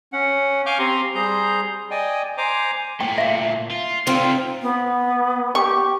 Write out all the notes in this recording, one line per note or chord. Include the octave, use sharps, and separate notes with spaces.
C#4 F#5
F5 G#5 C#6 D6 F6 G6
C4 G4 A#5 C6
G3 G#4 C5 A#5 G6
D5 D#5 G5 G#5
C5 G#5 A#5 D6
A#2 A3 G5
E5 F5
F4
A3 C4 D#4 F4
B3
G4 C#6